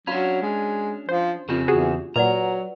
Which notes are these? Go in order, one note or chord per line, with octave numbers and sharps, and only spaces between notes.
F#3 C#4 D4 F#4 F5 B5
G#3
F3 C5
F2 C#3 C4 D4 F4 G4
E2 F#4 G#4
A#2 F#3 B4 D5 F#5 A#5